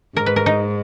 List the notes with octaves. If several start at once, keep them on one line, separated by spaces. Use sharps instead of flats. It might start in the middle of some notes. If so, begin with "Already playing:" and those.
G#2 A#4
B4
A#4
D#4